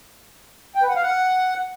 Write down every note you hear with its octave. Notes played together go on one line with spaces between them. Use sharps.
G5
B4
F#5
F5
F#5